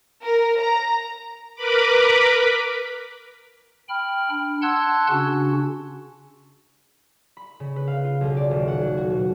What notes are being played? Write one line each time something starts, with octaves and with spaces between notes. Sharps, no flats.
A#4
A#5
A#4 B4 B5 D6
G5 B5 F6
D4
F#5 A5 C6 E6 F#6 G#6
C#3 C#4 D4 F#4
B5
C#3
B4
F5
F4
B1
D5
D#1
F#5
F#3
F#4
B2